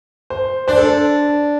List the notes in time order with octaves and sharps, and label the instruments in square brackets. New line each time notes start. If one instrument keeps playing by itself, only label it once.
[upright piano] C5
[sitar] D4 [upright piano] C5
[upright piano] A4